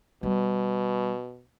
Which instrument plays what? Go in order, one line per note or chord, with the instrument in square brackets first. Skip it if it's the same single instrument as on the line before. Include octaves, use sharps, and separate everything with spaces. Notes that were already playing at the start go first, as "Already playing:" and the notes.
[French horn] B2 [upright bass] G3 B3